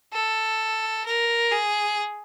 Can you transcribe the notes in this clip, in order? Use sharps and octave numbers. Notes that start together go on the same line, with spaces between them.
A4
A#4
G#4